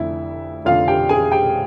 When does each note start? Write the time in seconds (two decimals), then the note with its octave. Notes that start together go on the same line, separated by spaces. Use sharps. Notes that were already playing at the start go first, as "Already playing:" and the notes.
Already playing: F1 F2 D3 E4 E5
0.65 F1 F2 D3 F4 F5
0.88 G4 G5
1.09 G#4 G#5
1.32 G4 G5